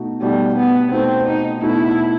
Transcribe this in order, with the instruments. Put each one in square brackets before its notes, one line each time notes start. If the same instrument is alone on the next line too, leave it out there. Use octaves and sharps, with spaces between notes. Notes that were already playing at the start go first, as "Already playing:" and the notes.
Already playing: [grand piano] B2 A3 D#4 F#4
[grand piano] B2 A3 D#4 F#4 [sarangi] G3
[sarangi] B3
[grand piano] B2 A3 D#4 F#4 [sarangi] C4
[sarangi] D#4
[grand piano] B2 A3 D#4 F#4 [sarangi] E4